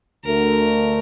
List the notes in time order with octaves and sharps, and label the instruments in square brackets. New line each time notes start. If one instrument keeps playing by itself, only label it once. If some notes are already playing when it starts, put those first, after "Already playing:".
[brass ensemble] D2 D3 A3 [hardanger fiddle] A#4